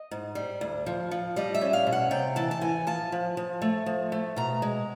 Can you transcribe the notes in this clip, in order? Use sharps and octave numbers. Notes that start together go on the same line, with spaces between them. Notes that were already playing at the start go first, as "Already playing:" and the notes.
Already playing: D#5
G#2
G3
D2
F3
F3
G3 D#5
E5
C#4
F5
B2
F#5
C3 G5
E3 A5
A5
E3 G#5
F3 A5
F3
F3
A3
F3
A3
B2 A#5
G#3